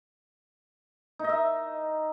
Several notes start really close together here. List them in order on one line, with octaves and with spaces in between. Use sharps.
D#4 D#5 E5